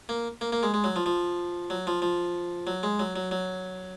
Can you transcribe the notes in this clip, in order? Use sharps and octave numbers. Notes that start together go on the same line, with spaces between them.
A#3
A#3
A#3
G#3
G#3
F#3
F3
F3
F#3
F3
F3
F#3
G#3
F#3
F#3
F#3